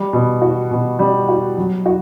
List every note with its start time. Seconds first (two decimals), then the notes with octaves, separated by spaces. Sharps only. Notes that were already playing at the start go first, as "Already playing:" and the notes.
Already playing: G3
0.13 B2
0.42 F#4
0.71 B2
0.99 G3
1.28 F#4
1.57 F#3
1.86 F#4